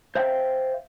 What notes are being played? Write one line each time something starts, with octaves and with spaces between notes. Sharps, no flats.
C5 E5 F5 G5